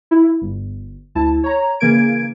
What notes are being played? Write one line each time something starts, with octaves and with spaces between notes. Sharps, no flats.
E4
G1
D2 E4 A5
C#5 A#5
C#3 E3 A#3 A#4 G#6 D7